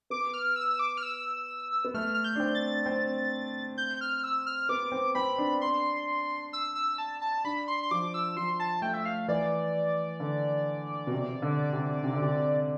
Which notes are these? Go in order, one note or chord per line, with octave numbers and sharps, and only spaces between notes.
B3 D6
F6
E6
E6
D6
F6
E6
B3
A3 F6
F6
G6
D4
C4
A6
C4
G6
F6
E6
F6
B3 D6
C4
C4 B5
D4
C6
E6
E6
A5
A5
D4 B5
C6
C6
F3 D6
E6
F3 C6
A5
A3 G5
E5
F5
E3 D5
D3
B2
C3
D3
C3
C3
D3
C3